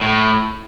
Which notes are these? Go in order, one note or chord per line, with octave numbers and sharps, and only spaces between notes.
A2